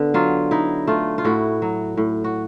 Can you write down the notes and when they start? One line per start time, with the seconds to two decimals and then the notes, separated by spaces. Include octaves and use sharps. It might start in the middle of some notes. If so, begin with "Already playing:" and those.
Already playing: D3 B3
0.14 F#3 F4
0.51 D#4 E4
0.87 A3 F4
1.18 F4
1.24 A2 E4 F#4
1.62 F#3
1.97 A2
2.24 F#4